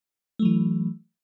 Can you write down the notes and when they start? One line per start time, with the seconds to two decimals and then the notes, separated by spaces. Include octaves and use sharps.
0.39 A3
0.42 F#3
0.45 E3